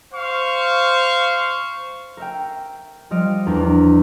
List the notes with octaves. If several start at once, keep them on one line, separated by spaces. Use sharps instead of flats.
C5 F5 C#6
A#4 E5 G5
F3 G3 D#5 F6 D7
E2 D4 A#4